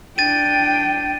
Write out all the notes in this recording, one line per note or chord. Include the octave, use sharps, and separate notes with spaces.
D4 G5 A6 D#7